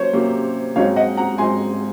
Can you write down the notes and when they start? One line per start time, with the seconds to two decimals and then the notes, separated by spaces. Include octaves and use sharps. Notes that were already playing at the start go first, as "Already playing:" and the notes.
Already playing: F#3 A#3 C#4 C5 C#5
0.13 C3 F#3 A#3 C#4
0.76 G#2 F#3 C4 D#4 C#5 F5
0.96 D#5 F#5
1.17 F#5 A#5
1.38 G#2 F#3 C4 D#4 G#5 C6